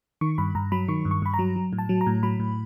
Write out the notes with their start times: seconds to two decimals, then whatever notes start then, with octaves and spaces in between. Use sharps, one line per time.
0.21 D#3 C#6
0.38 G2 B5
0.55 G2 A#5
0.72 F#3 B5
0.88 D#3 C#6
1.05 G2
1.11 C#6
1.22 G2 B5
1.34 A#5
1.39 F#3
1.56 F#3
1.73 A2
1.79 A5
1.89 F#3
2.01 A#5
2.07 A2
2.23 F#3 B5
2.40 A2